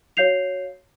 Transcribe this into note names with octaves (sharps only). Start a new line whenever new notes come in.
F#4 C#5 F5 G6 C7 F7